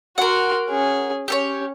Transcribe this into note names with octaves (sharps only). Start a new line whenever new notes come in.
F#4 A#4 F#5 C6
C#4 G#4
C#4 G4 A4 C#5